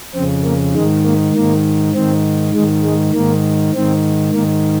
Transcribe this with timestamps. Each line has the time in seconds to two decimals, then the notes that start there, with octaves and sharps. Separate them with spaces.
0.14 F2 C#3 C4
0.44 A#3
0.74 G#2 D#3 G#3
1.04 A#3
1.34 G#2 D#3 A#3
1.94 G#2 D#3 C4
2.54 G#2 D#3 G#3
2.83 G#3
3.14 G#2 D#3 A#3
3.74 G#2 D#3 C4
4.33 G#2 D#3 A#3